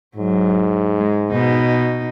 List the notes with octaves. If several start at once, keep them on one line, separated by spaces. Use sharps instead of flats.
G#2 F#3
G#3
B2 D#4